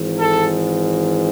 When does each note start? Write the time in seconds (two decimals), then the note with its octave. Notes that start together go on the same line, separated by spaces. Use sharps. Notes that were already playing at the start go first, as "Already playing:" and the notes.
Already playing: G#1 G#2 E3
0.17 A4